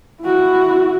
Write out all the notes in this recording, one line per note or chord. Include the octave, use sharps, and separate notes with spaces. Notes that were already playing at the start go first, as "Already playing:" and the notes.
E4 F#4